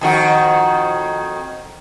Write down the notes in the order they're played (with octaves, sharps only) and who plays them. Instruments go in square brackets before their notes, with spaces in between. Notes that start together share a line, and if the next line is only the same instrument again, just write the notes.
[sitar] F2 D#3 F#4